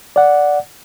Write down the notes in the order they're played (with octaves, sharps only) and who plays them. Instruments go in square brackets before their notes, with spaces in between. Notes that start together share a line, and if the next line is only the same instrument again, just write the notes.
[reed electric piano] D5 F#5